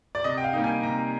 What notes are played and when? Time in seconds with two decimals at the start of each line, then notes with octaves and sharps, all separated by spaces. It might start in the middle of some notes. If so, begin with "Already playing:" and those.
0.15 D5
0.24 C3 D#5
0.38 G5
0.44 F5
0.53 G3 A#3 D#4
0.64 G#5
0.82 C3 A#5